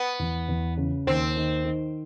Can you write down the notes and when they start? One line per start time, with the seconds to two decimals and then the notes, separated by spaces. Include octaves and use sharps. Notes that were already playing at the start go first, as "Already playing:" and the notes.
Already playing: B3
0.19 E2
0.48 E2
0.77 C#3
1.07 D#2 C4
1.37 D#3
1.65 D#3